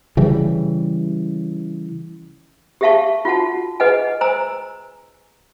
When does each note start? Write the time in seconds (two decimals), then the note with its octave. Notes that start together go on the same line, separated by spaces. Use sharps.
0.17 C#3 E3 G3
2.81 G4 G#4 E5 F5 A5 C#6
3.25 F4 F#4 F#5 A5
3.80 G#4 B4 D#5 F#5 G#5
4.21 C5 G#5 A#5 E6